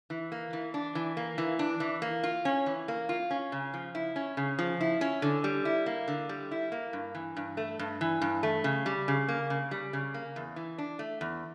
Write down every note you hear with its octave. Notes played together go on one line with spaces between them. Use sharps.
E3
A#3
E3
D4
E3
A#3
E3
D4
E3
A#3
F4
C#4
E3
A#3
F4
C#4
C#3
F3
E4
C#4
C#3
F3
E4
C#4
D3
G3
E4
A#3
D3
G3
E4
A#3
G2
E3
G2
A3
G2
E3
G2
A3
C#3
G3
C#3
A#3
C#3
G3
C#3
A#3
E2
E3
D4
A3
E2